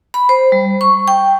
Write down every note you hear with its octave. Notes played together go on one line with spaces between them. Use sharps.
B5
C5
G3
C#6
G5